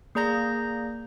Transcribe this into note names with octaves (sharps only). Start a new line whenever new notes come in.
A#3 G#4 D5 A#5 G6 A#6